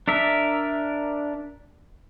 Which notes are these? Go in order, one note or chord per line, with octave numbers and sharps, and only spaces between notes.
D4 A#4 E5